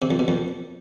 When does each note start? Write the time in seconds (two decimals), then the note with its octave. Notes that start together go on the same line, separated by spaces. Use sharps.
0.02 C3
0.11 F2
0.19 B2
0.28 F2